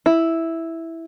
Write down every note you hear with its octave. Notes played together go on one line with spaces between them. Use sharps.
E4